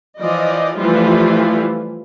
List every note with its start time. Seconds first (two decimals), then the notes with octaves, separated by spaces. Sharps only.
0.19 E3 F3 D5 D#5
0.76 E3 F3 G3 A3 E4 F4